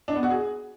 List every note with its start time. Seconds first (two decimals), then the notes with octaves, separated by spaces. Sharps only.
0.08 D4
0.15 B3
0.23 F#4
0.30 G#4